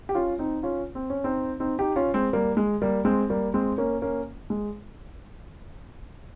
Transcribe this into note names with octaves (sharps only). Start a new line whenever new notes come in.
G4
C#4 F4
C4 D#4
C#4 F4
C4
C#4
C4 D#4
C4 D#4
D#4 G4
C#4 F4
G#3 C4
G3 A#3
G#3
G3 A#3
G#3 C4
G3 A#3
G#3 C4
A#3 C#4
A#3 C#4
G#3